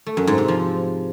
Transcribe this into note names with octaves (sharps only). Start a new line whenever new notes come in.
A3
F#2
G#2
C3
F3